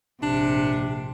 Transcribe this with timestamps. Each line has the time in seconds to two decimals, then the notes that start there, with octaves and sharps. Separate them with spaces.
0.22 A#1 G#2 C3 D4